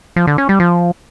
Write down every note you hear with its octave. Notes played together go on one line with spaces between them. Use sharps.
F3
D3
C#4
G3
F3